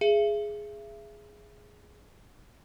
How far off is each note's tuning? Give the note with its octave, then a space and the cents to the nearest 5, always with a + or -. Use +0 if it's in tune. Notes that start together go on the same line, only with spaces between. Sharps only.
G#4 +0 E5 +35